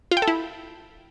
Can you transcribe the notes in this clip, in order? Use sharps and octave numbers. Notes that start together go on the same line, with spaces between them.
F4
G5
A4
E4